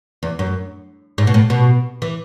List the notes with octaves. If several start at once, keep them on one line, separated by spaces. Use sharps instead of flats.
E2
F#2
G#2
B2
A2
B2
E3